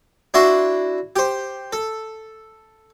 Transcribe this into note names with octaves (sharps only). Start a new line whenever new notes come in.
D4 E4 F#4 A5 C6
G4 C5
A4